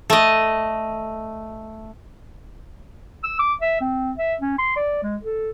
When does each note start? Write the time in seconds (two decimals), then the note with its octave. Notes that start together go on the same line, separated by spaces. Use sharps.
0.10 A3 D#5
3.23 E6
3.39 D6
3.61 E5
3.81 C4
4.18 E5
4.40 C#4
4.58 C6
4.76 D5
5.03 G#3
5.23 A4